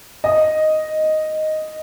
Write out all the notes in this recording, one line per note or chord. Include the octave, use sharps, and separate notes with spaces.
D#5